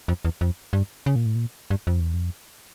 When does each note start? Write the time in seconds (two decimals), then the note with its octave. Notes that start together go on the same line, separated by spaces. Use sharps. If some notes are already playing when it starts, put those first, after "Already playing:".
0.08 F2
0.25 E2
0.41 F2
0.73 G2
1.06 C#3
1.16 A#2
1.26 A2
1.35 A#2
1.70 G2
1.87 F2
2.00 E2
2.14 F2